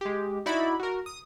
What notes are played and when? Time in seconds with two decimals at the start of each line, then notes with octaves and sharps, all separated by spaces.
0.01 G#3 G4
0.46 D#4 E4 F#4 D5 E5 B5
0.80 F#4 A#4
1.06 D#6